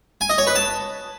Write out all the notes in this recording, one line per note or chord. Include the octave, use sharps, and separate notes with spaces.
G#5
D#5
C#5
B4
A5